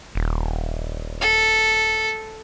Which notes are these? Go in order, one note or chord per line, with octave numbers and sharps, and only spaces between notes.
D#1
A4